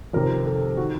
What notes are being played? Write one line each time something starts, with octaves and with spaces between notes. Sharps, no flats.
F2 C3 D#3 A#4
A4
D#3 F#4